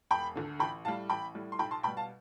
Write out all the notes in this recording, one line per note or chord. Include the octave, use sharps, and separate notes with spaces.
E1 G5 B5
D2 D3
A1 G5 B5
A2 G3 F5 A5
A1 G5 B5
A2 G3
C6
B1 G5 B5
A5 C6
B2 G3 G5 B5
F5 A5